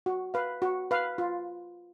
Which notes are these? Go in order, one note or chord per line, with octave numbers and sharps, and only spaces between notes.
F#4
B4 F5
F#4
B4 F5
F4